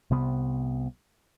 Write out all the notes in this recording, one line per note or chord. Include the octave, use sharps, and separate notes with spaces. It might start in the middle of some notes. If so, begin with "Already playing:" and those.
C2 C3 B3